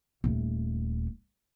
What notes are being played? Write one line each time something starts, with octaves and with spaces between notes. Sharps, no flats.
D#1 A3